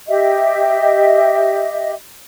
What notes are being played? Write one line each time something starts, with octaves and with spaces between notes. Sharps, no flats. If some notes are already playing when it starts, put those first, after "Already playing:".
G4 D#5 E5